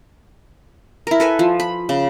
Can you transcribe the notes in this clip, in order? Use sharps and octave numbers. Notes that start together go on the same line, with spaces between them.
E4 A#4
A4 B4 G#5
F3
B5
C#3